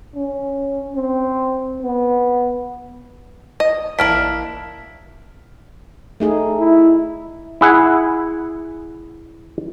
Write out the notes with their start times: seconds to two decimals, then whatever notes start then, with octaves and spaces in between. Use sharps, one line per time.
0.15 C#4
0.95 C4
1.83 B3
3.60 D#5
3.99 A1 A#3 D4 E4 F6 B6
6.20 A3 D#4 G#4
6.60 E4
7.61 E4 G#4 F#5